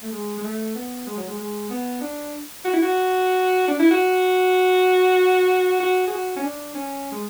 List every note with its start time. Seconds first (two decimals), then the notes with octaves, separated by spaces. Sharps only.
0.02 A3
0.12 G#3
0.38 G#3
0.44 A3
0.75 B3
1.07 G#3
1.17 F#3
1.27 G#3
1.38 G#3
1.70 B3
2.01 D4
2.65 F#4
2.73 E4
2.82 F#4
3.68 D4
3.79 E4
3.91 F#4
5.80 F#4
6.08 G#4
6.12 F#4
6.37 C#4
6.43 D4
6.74 C#4
7.12 G#3